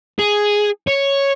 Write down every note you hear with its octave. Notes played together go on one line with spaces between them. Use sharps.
G#4
C#5